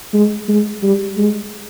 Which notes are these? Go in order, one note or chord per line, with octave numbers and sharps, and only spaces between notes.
G#3
G#3
G3
G#3